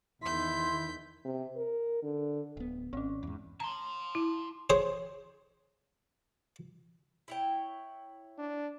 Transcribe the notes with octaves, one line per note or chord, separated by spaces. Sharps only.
E2 D#3 E4 C6 G6 B6
C3
A#4
D3
D1 B3
G#1 C4 C#4
E2 G#2
A5 A#5 C6
E4
G#4 C5 C#5
E4 C#5 G5
D4